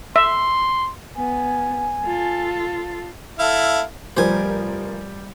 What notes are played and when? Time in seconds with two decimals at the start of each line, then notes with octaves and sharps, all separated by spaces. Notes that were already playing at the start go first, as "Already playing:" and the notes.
0.16 E5 C6
1.16 B3 G#5
2.05 F4 A4
3.39 E4 A4 F5
4.17 F1 F3 G3 A#4 C5 G#5